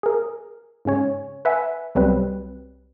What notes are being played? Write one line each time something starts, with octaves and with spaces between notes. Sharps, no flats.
G#4 A#4
G#2 C#3 C#4 C#5
B4 E5 F#5 G#5
C2 F#3 G3 C4 B4